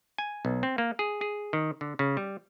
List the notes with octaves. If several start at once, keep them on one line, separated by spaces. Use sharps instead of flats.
G#5
B1
C4
A#3
G#4
G#4
D#3
D3
C#3
G3